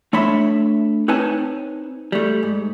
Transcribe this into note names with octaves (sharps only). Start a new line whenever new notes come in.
A3 D4 C#5 E5 B5 C6
C4 D#4 B4 C#5 G#5 A5
G3 A3
G#2